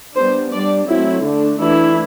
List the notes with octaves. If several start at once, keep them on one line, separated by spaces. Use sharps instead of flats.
G3 B3 D4 C5
G3 D4 D5
F#3 A3 C4 E4
D3 A3 D4
E3 A3 D4 E4